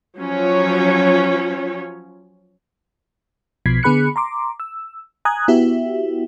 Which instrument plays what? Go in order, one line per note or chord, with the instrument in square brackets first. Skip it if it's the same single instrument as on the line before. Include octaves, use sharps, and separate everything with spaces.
[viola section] F3 F#3 C#4 F4 C#5
[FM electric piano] B1 B2 F3 G#6 B6 C7
D3 B3 G#4 B5 F#6 C#7
A#5 C6 D6
E6
G#5 A#5 D#6 F#6 G#6
B3 E4 F#4 G4 E5